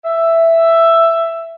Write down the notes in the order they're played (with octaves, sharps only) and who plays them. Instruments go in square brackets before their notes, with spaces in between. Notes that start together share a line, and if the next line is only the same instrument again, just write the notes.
[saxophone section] E5